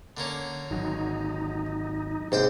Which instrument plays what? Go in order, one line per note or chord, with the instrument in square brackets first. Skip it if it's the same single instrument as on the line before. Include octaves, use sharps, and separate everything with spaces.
[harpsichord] D3 A#3 C#4
[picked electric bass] G#1 F#3 [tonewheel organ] D#4
[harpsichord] D#2 C5 G5 [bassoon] G#2 [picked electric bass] C3